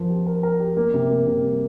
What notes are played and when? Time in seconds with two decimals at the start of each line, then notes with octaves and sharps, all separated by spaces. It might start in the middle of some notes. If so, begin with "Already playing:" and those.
Already playing: F3 A#4
0.09 G4
0.27 A#4
0.43 A#4
0.60 G4
0.77 A#3
0.94 C3
1.10 A#3
1.26 C3
1.43 G3